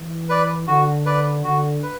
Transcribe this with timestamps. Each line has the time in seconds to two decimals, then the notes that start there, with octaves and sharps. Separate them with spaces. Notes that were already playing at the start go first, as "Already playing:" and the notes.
Already playing: E3
0.29 B4 D5
0.67 D3 F#4
1.06 B4 D5
1.44 D3 F#4
1.83 B4